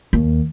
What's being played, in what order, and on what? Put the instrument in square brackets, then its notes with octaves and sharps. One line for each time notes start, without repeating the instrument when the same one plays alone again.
[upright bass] D#2